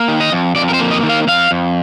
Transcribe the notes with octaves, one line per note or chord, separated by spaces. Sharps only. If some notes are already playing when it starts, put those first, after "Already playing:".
Already playing: A#3
D#3
D#5
F2
F2 D5
A#4
C5
A#3
D#5
D#3
F5
F2 F5
F2